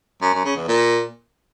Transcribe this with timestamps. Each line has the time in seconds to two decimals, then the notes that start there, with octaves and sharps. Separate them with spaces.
0.22 F#2
0.33 F#2
0.45 C#3
0.56 E2
0.68 A#2